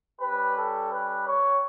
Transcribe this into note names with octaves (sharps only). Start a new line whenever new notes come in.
G3 C#4 G4 B4
A4
B4
C#5